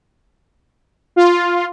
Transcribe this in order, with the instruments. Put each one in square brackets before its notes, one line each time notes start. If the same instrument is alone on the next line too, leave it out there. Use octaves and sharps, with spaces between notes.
[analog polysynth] F4